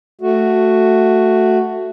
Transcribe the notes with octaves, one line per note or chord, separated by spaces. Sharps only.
A3 F#4